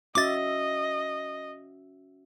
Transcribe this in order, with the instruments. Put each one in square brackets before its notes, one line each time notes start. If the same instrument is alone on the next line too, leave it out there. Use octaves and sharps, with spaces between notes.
[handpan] C#4 F#4 E5 [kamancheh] D#5 [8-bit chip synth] D6 A6